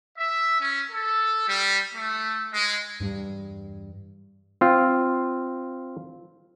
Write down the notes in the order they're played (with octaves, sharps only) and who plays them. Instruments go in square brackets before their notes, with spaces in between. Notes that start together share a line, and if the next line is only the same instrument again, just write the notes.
[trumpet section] E5
C#4
A4
G3
A3
G#3
[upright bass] E2 G2
[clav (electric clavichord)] C4 F4